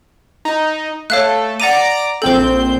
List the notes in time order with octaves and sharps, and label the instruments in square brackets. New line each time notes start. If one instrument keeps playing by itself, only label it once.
[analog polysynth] D#4
[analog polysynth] A3 A4 [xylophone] C#5 F5 F#6
[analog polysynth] D5 A#5 D6 [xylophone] F#5 D#7
[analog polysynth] A#1 C4 G6 [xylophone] A4 C5